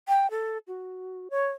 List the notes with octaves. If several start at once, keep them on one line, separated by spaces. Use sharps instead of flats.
G5
A4
F#4
C#5